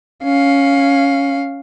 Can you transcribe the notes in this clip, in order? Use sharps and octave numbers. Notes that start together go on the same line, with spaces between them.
C#4 F5